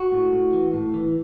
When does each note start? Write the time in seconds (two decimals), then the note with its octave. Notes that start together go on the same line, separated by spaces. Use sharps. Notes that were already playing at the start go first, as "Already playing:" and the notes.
Already playing: F#4
0.12 A2
0.32 A2
0.53 E3
0.73 A2
0.94 E3